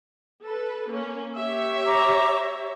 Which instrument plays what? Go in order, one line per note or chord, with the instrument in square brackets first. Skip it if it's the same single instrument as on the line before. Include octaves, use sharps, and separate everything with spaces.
[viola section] A4 B4
A#3 C#4
G4 C#5 E5
[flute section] A#5 D6